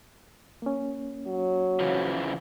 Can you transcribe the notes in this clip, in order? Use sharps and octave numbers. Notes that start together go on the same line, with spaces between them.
A#3 C#4
F#3
C#3 E3 F3